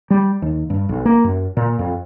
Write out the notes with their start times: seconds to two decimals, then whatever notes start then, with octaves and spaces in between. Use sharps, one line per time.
0.10 G3
0.42 D#2
0.70 G2
0.89 B1
1.05 A#3
1.24 F#2
1.57 A#2
1.79 F2